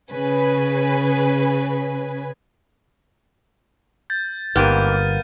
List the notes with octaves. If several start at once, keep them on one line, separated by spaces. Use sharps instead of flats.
C#3 B4 G#5
G6 A6
G1 G#2 A#3 B3 G4 F6 D#7